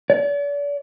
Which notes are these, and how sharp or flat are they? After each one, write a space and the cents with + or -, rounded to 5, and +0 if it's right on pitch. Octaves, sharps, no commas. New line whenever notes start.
D5 -40